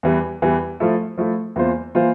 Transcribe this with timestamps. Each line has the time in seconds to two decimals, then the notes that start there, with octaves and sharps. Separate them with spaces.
0.03 E2 E3 G3
0.42 E2 E3 G3
0.80 F3 A3 E4 A4
1.18 F3 A3 E4 A4
1.56 E2 E3 A#3 F4 C5
1.95 E3 A#3 F4 C5